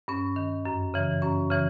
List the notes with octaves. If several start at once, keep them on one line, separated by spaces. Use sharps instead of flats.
G2 C#4
D#3
F#2
C#3 E3
F#2 C#4
C#3 E3